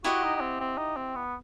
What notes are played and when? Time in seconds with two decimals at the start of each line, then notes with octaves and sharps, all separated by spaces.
0.04 E4 F#4 G4 D#5 F#5
0.24 D#4
0.37 D#4
0.41 C4
0.60 C4
0.78 D#4
0.97 C4
1.16 B3